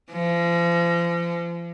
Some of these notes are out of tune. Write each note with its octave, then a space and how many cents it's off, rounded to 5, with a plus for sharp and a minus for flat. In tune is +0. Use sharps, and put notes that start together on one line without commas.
F3 -35